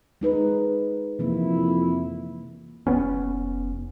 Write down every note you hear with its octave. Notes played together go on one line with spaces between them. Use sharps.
G#3 D#4 B4
F2 C3 E3 A#3 E4
F1 A2 B3 C#4